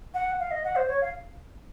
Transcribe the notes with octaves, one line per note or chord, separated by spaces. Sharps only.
F#5
F5
D#5
F#5
C5
C#5
F5